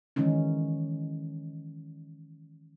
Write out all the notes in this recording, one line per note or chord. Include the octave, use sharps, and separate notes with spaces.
D#3 E3 G#3 C#4 D#4